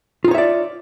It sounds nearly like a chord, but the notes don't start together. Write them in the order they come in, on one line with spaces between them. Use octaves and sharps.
F4 D#4 C#5 E5 D5